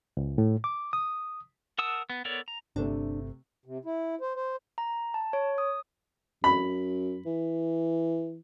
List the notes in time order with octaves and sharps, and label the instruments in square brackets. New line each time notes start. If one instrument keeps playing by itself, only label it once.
[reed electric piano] C#2
A2
D6
D#6
[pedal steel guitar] A#4 F#5 A5 D#6 E6
B3
B3 A4 A#4 C#5 D5
A#5
[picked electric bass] G1 [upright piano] C3 A3 C4 [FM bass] D4
[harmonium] C3
E4
C5
C5
[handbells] A#5
A5
C#5
D#6
[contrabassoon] F#2 [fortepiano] B5
[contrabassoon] E3